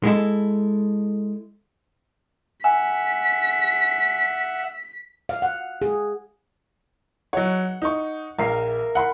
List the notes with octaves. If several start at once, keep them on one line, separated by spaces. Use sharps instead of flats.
G#3 E4 A4
E5 F#5 G#5 E6 B6
F5
F#5
G#4
F#3 C#5 F#5
D#4 C#6
A#1 A#4 E5 F5 C7
F#5 B5 C6